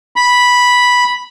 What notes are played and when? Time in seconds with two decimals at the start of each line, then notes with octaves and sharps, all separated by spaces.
0.16 B5